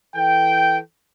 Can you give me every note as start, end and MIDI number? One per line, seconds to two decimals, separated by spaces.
0.14 0.79 52
0.14 0.79 69
0.14 0.79 79